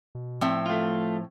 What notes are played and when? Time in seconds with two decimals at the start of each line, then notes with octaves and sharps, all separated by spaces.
0.15 B2
0.41 A2 F3 C4 E5
0.66 A3 F4